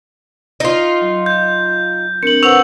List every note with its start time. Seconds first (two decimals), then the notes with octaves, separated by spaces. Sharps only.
0.60 D#4 F4
1.01 F#3
1.26 G6
2.23 C4 D4 A#4 C#7 F#7
2.43 B4 C5 F#5 C#6 E6 F7